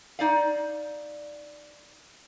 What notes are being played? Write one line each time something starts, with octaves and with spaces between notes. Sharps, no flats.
D#4 D5 F5